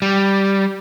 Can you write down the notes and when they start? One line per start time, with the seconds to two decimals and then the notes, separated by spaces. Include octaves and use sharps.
0.02 G3